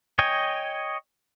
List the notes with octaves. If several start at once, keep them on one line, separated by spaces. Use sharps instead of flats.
C#5 D#5 G5 G#5